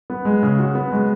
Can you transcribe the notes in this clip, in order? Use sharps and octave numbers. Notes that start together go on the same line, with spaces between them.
B3
G#3
C#3
F#4
B3
G#3